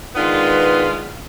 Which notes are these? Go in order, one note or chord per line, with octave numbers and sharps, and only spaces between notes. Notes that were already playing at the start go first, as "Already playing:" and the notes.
D#3 G#3 B3 D4 F4 B4